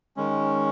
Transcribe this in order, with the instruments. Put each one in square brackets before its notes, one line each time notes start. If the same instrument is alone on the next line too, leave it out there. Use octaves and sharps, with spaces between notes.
[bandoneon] D#3 G#3 C#4